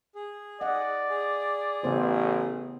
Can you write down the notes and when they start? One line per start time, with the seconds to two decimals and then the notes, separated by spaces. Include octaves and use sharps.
0.15 G#4
0.61 D5 D#5 F#5
1.10 G#4
1.84 A1 C#3 B3 C5